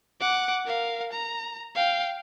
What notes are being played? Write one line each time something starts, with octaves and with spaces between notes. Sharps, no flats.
F#5 D6
A#4 F5
A#5
F5 G5